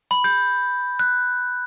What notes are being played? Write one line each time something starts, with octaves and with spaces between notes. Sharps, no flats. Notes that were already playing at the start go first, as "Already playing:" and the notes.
B5
G6
F#6